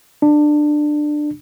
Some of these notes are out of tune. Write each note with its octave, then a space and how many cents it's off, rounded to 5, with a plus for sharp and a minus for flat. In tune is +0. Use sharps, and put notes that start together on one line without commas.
D4 +20